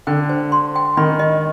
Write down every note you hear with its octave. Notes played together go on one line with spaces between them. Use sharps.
D3 G5
C5
C6
G5
D#3 B5
D#5